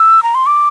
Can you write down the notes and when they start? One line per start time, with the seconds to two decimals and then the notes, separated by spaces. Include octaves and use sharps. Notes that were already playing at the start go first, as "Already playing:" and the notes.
Already playing: E6
0.23 A#5
0.35 C6
0.46 D6